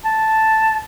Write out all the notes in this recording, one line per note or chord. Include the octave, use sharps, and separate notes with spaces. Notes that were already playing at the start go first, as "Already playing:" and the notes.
A5